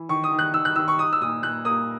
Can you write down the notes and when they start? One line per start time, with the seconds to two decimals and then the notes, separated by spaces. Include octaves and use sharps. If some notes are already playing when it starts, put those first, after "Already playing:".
Already playing: E3
0.09 D#3 C#6
0.24 D#6
0.32 D#3
0.39 F#6
0.54 D#3 E6
0.65 F#6
0.76 D#3 E6
0.88 C#6
0.99 D#4 D#6
1.13 E6
1.22 A#2 D#6
1.43 A#2 F#6
1.65 A#3 D#6